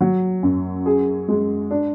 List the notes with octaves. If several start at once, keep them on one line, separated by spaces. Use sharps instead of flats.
F#3
F#2
G#4
G#3
D4